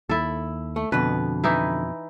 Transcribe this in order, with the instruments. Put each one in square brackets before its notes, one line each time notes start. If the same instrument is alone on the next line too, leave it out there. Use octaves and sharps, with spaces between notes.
[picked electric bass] D#2 [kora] E4 A4
[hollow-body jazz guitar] A3
[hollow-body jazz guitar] F2 B2 [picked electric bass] D3 [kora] B4
[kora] E3 D#4 E4